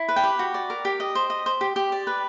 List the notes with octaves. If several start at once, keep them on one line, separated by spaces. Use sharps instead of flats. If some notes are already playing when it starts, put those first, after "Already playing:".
Already playing: E4
B4
G5
G4
F#4
D5
A#4
G4
D#5
C5
D#5
C5
G4
G4
D5
B4